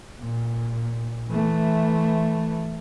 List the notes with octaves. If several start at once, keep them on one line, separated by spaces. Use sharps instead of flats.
A#2
E3 A3